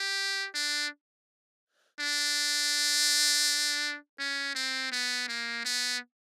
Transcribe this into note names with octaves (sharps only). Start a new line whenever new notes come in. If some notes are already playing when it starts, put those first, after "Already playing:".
Already playing: G4
D4
D4
C#4
C4
B3
A#3
B3